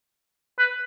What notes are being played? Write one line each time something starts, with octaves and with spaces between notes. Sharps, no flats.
B4